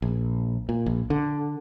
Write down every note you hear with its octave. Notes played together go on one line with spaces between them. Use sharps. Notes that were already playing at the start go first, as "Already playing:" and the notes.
A#1
A#2
A#1
D3